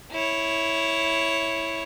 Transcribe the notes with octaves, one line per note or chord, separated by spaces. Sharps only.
E4 C#5